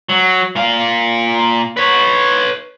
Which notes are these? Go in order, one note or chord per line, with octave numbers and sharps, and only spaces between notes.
F#3
A#2 F5
B4 C#5